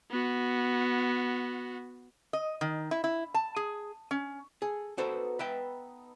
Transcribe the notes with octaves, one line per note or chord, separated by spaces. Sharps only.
B3 F#4
D#5
D#3
E4
E4
A5
G#4
C#4
G#4 A4
B3 D#4 F#4 A4 C5
B4 E5 G5